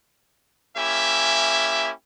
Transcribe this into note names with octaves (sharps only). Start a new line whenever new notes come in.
A#3 C#4 E4 G4 E5 G#5